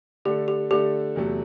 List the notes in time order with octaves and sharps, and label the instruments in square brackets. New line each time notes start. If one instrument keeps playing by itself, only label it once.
[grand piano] D3 A3 D4 A4 [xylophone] G4
[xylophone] G4
[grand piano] D3 A3 D4 A4 [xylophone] G4
[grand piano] E2 C3 F#3 A3